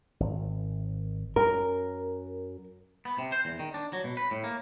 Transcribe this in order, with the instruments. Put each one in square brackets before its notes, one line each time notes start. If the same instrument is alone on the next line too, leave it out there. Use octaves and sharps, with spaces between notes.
[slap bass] G#1
[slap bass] F#2 [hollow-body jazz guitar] A#4
[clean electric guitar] B3
C3
C5
E2
D#3
D4
F#3
B2
B4
A2
A#3